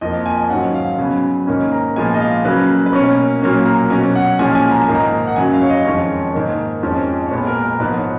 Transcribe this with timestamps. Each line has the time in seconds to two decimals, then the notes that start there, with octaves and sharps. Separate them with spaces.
0.01 F2 F3 A#3 D#5
0.26 G#5
0.49 G#2 D#3 F#3 C#4 F#5
0.74 F5
0.98 C#3 F#3 B3 G#5
1.47 G#2 D#3 A#3 C#4
1.72 A#5
1.96 A#2 F3 G#3 B3 G#5
2.14 D#5
2.20 F5
2.45 C#3 F#3 A#3 B4
2.86 B4
2.93 B2 A#3 C#4 C#5
3.42 A#2 F#3 A#3 C#4
3.66 A#5
3.90 B2 F#3 C#4 G#5
4.16 F#5
4.39 A#2 F3 G#3 C#4 G#5
4.55 G#5
4.71 A#5
4.88 G#2 D#3 A#3
4.95 A#5
5.27 F#5
5.36 F#2 C#3 F#3 G#5
5.53 F5
5.62 C#5
5.70 D#5
5.85 F2 D#3 G#3 C#4 C#5
6.34 G#2 D#3 A#3
6.82 F2 F3 G#3 C#4
7.26 C#5
7.31 A#2 B4
7.34 G#3 B3
7.47 A#4
7.64 A#4
7.80 G#2 F3 B3 B4
7.96 C#5